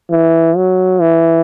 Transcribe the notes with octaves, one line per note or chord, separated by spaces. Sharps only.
E3
F#3
E3